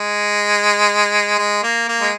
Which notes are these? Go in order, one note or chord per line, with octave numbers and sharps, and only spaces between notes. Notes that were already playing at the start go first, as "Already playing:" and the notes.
Already playing: G#3
G#3
A#3
A#3
G#3